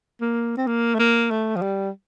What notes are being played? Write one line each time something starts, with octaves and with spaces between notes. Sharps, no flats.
A#3
C4
A#3
A3
A#3
A3
F3
G3